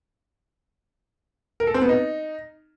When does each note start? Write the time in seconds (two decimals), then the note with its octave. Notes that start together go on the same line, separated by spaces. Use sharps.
1.60 A#4
1.67 A4
1.74 C4
1.82 B3
1.89 D#4